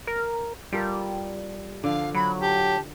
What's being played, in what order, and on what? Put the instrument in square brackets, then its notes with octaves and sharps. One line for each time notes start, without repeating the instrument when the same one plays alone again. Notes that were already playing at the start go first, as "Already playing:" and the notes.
[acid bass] A#4
[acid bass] G3 [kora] F4 A4 A#4
[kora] D3 F3 [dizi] F5
[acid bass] F#3 [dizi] B5
[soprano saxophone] G4 [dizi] A5